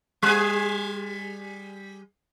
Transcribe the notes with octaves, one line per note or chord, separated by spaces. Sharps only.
G3 G#4